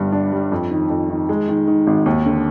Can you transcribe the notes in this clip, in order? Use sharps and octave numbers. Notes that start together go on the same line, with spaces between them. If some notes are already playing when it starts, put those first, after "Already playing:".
Already playing: G1 G2 G3
D4
G3
F2
D#3
F2
D#3
G#3
D#3
D#3
G#1
D#2
D3